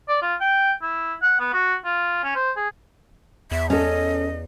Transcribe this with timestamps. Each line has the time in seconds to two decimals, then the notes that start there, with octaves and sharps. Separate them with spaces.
0.08 D5
0.22 F4
0.41 G5
0.82 E4
1.22 F#5
1.40 B3
1.53 F#4
1.85 F4
2.24 C#4
2.35 C5
2.56 G#4
3.51 E2 E5
3.70 C#4 A4 D#5